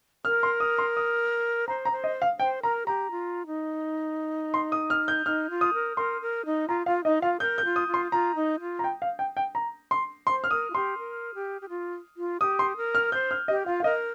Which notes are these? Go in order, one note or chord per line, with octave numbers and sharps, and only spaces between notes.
A#4 F6
C6
D#6
C6
D#6
C5 A#5
A#5
C5
D#5
F5
C5 G5
A#4 A#5
G4 A#5
F4
D#4
C6
D#6
F6
G6
D#4 F6
F4
D#6
A#4
A#4 C6
A#4
D#4
F4 A#5
F4 F5
D#4 D#5
F4 F5
A#4 G6
G6
F4
D#6
F4
C6
F4 A#5
D#4
F4
A#5
G5
F5
G5
G5
A#5
C6
C5 C6
F6
A#4 D#6
F4
G4 C6
A#4
G4
G4
F4
F4
G4 D#6
C6
A#4
F6
C5 G6
F6
G4 D#5
F4 F5
F5
A#4 D#5